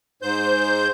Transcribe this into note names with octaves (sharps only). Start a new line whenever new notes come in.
G#2 C5 G6